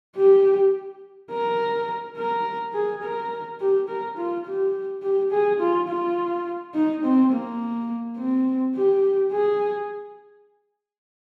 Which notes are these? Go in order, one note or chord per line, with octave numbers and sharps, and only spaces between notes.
G4
A#4
A#4
G#4
A#4
G4
A#4
F4
G4
G4
G#4
F4
F4
D#4
C4
A#3
C4
G4
G#4